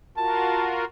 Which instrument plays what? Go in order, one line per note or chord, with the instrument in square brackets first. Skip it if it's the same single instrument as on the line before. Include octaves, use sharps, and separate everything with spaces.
[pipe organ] F4 F#4 A#4 [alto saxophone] A5